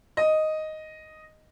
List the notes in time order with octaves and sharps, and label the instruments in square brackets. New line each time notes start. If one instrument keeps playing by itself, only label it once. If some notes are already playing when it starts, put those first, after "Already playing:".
[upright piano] D#5